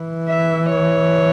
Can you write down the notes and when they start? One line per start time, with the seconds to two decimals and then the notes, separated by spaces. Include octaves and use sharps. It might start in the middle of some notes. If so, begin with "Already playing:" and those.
Already playing: E3
0.28 E5
0.69 C#5